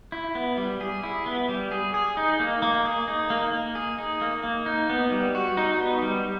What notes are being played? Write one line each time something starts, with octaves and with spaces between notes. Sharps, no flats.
E4
B3
G3
G#4
E4
B3
G3
G#4
G#4
D#4
A#3
A#3
G#4
D#4
A#3
A#3
G#4
D#4
A#3
A#3
D#4
B3
G3
F#4
D#4
B3
G3